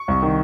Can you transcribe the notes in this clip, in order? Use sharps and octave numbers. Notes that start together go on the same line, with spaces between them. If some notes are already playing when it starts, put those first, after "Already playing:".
Already playing: C#6
C2
D#3